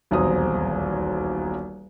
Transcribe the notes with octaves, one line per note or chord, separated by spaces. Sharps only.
D#1 B1 E2 C4 A#5 D#6